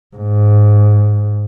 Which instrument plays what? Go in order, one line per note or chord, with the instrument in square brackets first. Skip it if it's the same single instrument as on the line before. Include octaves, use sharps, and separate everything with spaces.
[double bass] G#2